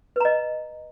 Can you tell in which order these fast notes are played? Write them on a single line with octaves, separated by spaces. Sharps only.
B4 A#5 D#5